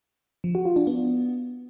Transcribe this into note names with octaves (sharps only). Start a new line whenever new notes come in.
F3
F#4
F4
D4
B3